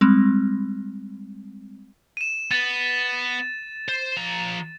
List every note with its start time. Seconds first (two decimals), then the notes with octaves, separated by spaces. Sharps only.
0.01 G3 G#3 C4
2.17 D#7 E7
2.51 B3 A6 D#7
3.89 C5
4.17 F3 A#5